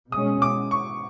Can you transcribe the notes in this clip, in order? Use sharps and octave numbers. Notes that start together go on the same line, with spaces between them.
B2 G#3 C#4 D#6
D6
C#6